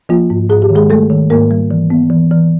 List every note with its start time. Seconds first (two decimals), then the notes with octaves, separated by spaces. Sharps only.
0.09 F3 A#3 F4
0.30 G#2
0.49 G#2 G#4
0.62 G4
0.69 D#3
0.75 G#3 G#4
0.90 G3 A3 A4
1.10 D#3
1.30 G#2 A#3 A#4
1.51 G3
1.71 E3
1.90 B3
2.10 E3
2.31 E3